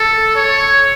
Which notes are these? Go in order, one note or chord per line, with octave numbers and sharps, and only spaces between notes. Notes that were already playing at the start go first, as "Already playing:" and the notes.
Already playing: A4
C#5